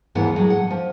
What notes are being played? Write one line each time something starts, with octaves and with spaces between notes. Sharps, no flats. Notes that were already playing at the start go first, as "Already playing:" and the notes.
D#2 G#2 E3 B3 F#5
A2 F#3 G#3
F#5
F3